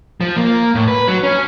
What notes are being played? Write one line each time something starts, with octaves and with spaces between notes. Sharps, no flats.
F3
A#3
A2
B4
F#3
C#4